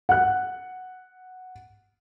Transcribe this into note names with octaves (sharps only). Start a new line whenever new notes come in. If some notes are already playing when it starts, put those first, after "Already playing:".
F#5 F#6